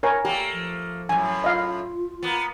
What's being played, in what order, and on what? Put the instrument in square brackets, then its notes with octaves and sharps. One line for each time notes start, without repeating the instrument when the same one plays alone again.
[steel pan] A#4 C#5 G#5
[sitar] A3 A#3 [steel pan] G4
[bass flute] F3
[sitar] F#2 A2 [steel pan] G#5
[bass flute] F4 [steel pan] D#5 F5
[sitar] A#3 B3